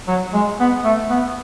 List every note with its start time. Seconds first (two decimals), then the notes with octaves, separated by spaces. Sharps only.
0.08 F#3
0.33 G#3
0.60 B3
0.85 A3
1.10 B3